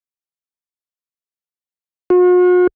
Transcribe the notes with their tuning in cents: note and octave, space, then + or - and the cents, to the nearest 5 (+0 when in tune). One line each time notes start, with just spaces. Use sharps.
F#4 -45